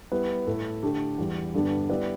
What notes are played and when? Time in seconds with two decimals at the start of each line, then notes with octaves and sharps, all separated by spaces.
0.12 G3 B3 E4 B4
0.47 A2 A3 E4
0.83 D3 A3 D4 G4
1.18 E2 E3 G3
1.54 G2 D3 G3 B3 D4
1.89 G3 B3 E4 B4 D5